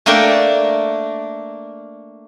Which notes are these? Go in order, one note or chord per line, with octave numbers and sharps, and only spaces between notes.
A3 A#3 D4 A4 A#4 G5